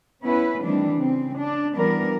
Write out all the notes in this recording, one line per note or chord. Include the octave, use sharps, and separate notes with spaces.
B3 C#4 E4 B4
D#3 E3 G3 A3 C4 D4
C#3 C4
D4
E3 G3 B3 D4 A#4